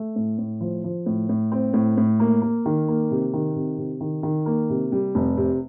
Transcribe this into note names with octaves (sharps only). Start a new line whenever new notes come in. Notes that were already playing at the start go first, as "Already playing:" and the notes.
Already playing: A3
A2
A2
F3
F3
A2
A2
C4
A2
A2
A#3
A#3
D#3
A#3
C3
D#3
C3
C3
D#3
D#3
A#3
C3
G3
F1
C3